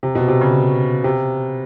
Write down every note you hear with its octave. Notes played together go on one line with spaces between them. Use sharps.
C3
B2
C3
C#3
C3